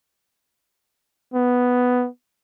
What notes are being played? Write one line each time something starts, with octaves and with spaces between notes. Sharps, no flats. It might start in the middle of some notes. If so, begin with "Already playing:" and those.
B3